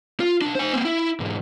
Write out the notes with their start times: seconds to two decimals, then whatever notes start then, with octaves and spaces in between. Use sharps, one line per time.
0.20 F4
0.42 B1 D4
0.55 C5 G#5
0.73 A#3 C4
0.85 E4
1.20 E2 G#2